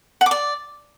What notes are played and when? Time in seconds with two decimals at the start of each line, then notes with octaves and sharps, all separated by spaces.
0.21 F#5
0.26 D6
0.31 D5